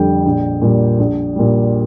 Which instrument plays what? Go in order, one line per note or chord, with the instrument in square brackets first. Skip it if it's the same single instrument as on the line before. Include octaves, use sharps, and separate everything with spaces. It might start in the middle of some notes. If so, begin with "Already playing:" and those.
Already playing: [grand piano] F2 D3 G3 G5
A#1
A#2 G3
A#1
A#2 G3